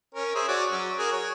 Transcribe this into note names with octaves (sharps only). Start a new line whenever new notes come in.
C#4 A#4
G#4 C5 E5
F#4 C#5 D5
F#3 C#4
F#4 G#4 A#4
C#5